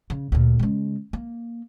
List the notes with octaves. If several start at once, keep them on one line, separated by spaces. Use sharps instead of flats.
C#3
D2 A#2
C#3 G#3
A#3